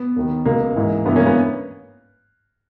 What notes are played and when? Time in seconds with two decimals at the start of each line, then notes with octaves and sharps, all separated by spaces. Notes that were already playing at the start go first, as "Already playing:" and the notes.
Already playing: B3
0.16 D#2 D#3
0.45 C#2 B2 A#3
0.76 G#2 E3
1.05 G2 E3 B3
1.16 A#3 C#4
1.26 B3